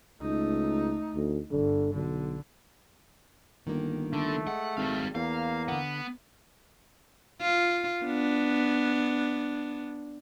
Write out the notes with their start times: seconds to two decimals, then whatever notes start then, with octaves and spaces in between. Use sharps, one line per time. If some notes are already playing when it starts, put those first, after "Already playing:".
0.21 C#2 A3 D#4
1.15 D2
1.51 G1 D3
1.94 B1 D3
3.67 G1 D#3 A#3
4.13 D3 A3
4.47 G#3 F#5
4.77 G#1 G3 F5
5.15 E2 A#3 F5
5.68 D3 B3 F#5
7.41 F4
8.05 B3 D4